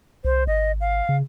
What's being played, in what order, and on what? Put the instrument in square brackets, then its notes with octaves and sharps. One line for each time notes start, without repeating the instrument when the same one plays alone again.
[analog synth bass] C2 [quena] C5
[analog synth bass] G#1 [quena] D#5
[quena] F5
[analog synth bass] C#3